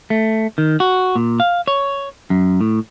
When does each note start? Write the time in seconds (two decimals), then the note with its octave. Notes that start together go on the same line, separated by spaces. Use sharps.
0.10 A3
0.58 D#3
0.80 F#4
1.16 A#2
1.40 F5
1.68 C#5
2.30 F#2
2.61 A2